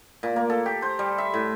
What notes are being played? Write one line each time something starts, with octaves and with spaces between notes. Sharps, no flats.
A#2
A#3
A4
G4
C5
G3
E5
A2